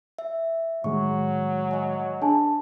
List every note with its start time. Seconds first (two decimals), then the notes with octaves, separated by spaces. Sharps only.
0.19 E5
0.84 A2 D#3 F#3 G#3 C#6
1.71 D#5 G#5
2.22 D4 G#4 G#5 A5